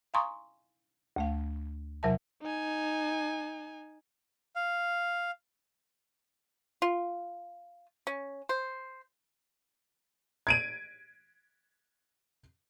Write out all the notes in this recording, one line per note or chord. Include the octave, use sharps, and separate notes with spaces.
F5 G#5 A#5 C6 C#6 D#6
D2 A3 F5
E2 C3 F#3 A#4 E5 A5
D#4 G#5
F5
F4
C#4
C5
G#6 D7 D#7